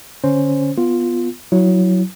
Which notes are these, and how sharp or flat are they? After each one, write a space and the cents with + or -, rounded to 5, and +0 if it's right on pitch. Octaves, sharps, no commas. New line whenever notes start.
D3 +0 C#4 +0 C5 +0
B3 +0 F4 +0
F#3 +0 E4 +0